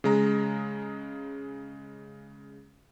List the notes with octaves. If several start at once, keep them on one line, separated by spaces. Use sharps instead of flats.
C#3 G#3 A#5